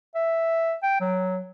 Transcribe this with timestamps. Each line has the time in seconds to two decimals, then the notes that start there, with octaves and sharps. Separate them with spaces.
0.15 E5
0.83 G5
1.01 F#3